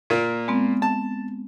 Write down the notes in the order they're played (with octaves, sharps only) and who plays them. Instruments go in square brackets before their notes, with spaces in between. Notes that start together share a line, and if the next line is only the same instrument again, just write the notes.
[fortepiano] A#2 A#3
[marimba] G#3 B3 C4
[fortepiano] A5